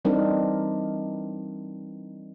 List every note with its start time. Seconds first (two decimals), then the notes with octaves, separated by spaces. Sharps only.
0.05 E3 G3 C4 D4 D#4 A#4